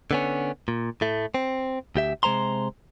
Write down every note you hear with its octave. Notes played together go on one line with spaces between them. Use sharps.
D3 B3 C#4
A#2
A2 A3
C4
D2 G4 E5
C3 G#3 C5 A#5 C6